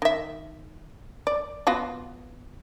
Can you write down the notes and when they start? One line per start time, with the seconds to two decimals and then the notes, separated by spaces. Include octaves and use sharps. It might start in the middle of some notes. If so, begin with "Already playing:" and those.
0.02 D#3 E5
1.27 D5
1.67 B3 F4 F#4